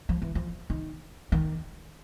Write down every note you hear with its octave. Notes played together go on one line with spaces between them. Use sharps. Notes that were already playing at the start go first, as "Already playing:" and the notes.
F3
E3
F3
D#3
D#3